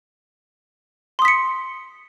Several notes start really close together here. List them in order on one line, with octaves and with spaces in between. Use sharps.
C6 D#6 B6 C#7